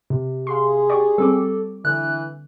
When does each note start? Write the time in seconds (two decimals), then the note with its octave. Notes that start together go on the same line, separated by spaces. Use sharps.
0.10 C3
0.47 G#4 F5 C6
0.90 G4 D5 C#6
1.18 G3 C4 A4 D6
1.85 D3 E3 F#6